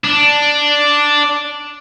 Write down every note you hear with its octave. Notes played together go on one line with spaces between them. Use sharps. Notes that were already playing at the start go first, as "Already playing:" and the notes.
D4